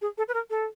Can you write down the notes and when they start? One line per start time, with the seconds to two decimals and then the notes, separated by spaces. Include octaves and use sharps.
0.01 G#4
0.18 A4
0.28 B4
0.34 A#4
0.50 A4